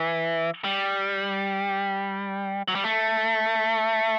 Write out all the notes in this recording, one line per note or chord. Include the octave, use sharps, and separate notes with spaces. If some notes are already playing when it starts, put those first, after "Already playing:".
Already playing: E3
G3
F#3
G3
A3